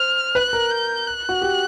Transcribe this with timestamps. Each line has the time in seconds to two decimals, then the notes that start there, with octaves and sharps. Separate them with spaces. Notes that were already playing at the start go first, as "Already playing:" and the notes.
Already playing: C5 F6
0.35 B4 F#6
0.53 A#4
0.70 G6
1.07 F#6
1.29 F#4
1.42 G4